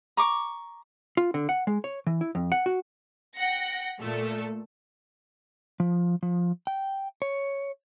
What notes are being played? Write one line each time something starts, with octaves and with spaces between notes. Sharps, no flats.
A#5 C#6 D6
F4
D3
F#5
G#3
C#5
E3
E4
F2
F#5
F#4
F#5 G5 A#6 C#7
A#2 A3 A4
F3
F3
G5
C#5